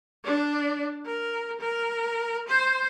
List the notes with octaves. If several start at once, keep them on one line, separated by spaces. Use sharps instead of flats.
D4
A#4
A#4
C5